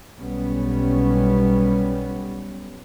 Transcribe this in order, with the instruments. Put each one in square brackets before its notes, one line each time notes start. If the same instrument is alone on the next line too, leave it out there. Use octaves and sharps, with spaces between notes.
[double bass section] B1 G3 B3 C#4